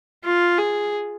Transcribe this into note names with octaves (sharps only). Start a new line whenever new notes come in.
F4
G#4